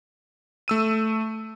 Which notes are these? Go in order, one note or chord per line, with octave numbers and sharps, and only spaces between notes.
A3 E6 D#7